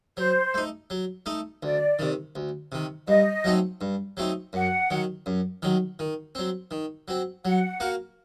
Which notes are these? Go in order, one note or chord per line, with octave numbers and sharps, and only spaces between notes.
F#3 C5
A3 D#4
F#3
A3 D#4
D2 D5
C3 D#3
D2
C3 D#3
G2 D#5
F#3 A3 C4 D#4
G2
F#3 A3 C4 D#4
F#2 F#5
D#3 F#3
F#2
D#3 F#3
D#3
F#3 C4
D#3
F#3 C4
F#3 F#5
A#3 F#4 A#4